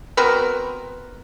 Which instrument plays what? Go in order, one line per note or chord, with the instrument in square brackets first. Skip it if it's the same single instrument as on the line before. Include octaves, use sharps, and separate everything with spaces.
[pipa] B3 C4 F#4 A#4